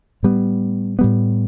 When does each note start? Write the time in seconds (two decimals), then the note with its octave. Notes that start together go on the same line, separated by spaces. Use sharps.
0.23 A2 G3 B3
0.99 A2 G3 B3